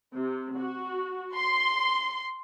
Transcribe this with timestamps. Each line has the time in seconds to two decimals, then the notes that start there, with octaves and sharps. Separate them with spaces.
0.13 C3
0.57 F#4
1.36 C6